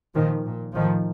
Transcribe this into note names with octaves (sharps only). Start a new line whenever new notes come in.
A#2 D#3 F3
A#2
A2 D#3 F3